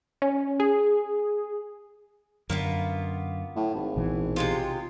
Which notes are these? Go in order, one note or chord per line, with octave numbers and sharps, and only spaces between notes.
C#4
G#4
F#2 D3 A#3 B3 F4
A2
G#1
A#1 B2 E3
C3 G#3 F4